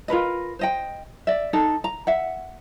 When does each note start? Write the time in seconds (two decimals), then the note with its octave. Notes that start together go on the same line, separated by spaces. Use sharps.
0.08 F4 A#4 B4 D#5
0.59 C5 D#5 G5
1.27 D5 E5
1.53 D#4 A4
1.84 A#5
2.07 E5 F#5